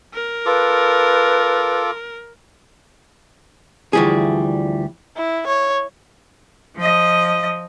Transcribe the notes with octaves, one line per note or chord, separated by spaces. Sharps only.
A#4
F4 A4 B4 D6
D2 E3 F3 G3 G#4
E4
C#5
F3 D#5